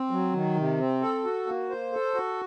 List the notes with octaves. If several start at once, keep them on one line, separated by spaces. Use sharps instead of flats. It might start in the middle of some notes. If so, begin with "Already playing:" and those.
Already playing: C4
F#3
D#3
C3
C4
A4
F#4
A#3
C5
A4
F#4